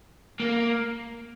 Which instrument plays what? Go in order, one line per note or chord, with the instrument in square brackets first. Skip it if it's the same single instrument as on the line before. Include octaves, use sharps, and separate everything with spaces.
[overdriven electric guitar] A#3